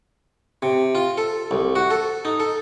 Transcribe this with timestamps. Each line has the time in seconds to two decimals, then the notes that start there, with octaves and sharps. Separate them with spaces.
0.62 C3
0.95 F4
1.18 A4
1.51 C2
1.75 F#4
1.90 A4
2.25 D#4
2.40 A4